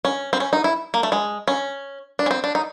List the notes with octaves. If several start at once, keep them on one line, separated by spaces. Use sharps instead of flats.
C#4
C4
C#4
D#4
E4
A#3
A3
G#3
C#4
D4
C#4
C4
D4
D#4